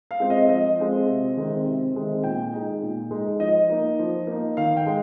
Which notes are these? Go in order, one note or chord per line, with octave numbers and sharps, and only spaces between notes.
F5
G#3 C4 F4
D#5
F3 D#5
G#3 C4 F4
C3
D#3 G#3 C4
C3
D#3 G#3 C4
A#2 G5
G#3 D#4
A#2
G#3 D#4
F3 D#5
A#3 D#4
F3
A#3 D#4
D#3 F5
G5
G#3